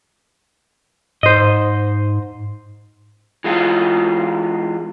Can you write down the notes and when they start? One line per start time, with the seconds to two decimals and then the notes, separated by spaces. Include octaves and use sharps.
1.23 G#2 C5 D#5
3.44 E3 G#3 F4